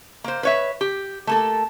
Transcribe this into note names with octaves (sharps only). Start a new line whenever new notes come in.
A#3 C5
B4 C#5 E5
G4
A3 A#3 A4